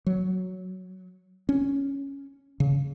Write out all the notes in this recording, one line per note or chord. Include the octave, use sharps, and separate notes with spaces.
F#3
C#4
C#3